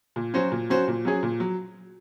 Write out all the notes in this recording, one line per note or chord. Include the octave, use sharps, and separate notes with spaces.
A#2
F#3 C#4 F#4 C5
A#2
F#3 C#4 F#4 C5
A#2
F#3 C#4 G#4
A#2
F#3